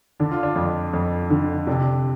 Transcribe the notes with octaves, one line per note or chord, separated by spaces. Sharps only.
D3 D4
F4
D4
F2
F2
D3
C3 D4